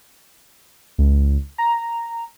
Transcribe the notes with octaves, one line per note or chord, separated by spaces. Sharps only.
C#2
A#5